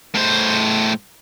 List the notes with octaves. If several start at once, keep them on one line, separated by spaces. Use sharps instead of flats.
A2 C5